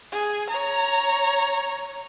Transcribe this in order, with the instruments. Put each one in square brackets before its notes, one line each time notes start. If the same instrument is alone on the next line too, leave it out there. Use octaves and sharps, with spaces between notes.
[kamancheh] G#4
C#5 A#5